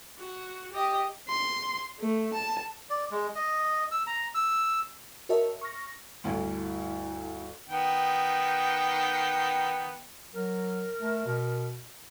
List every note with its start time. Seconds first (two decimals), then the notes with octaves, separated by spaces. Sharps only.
0.18 F#4
0.73 G4 D#5
1.29 C6
2.00 A3
2.34 A5
2.90 D5
3.11 G#3
3.35 D#5
3.91 E6
4.07 A#5
4.35 E6
5.29 F#4 A#4 C#5 D#5 E5 A5
5.61 C#6 F6 A#6
6.24 G1 D2 E4
7.69 D#3 B3 G5
10.33 F#3 A#4
11.01 A3
11.26 B2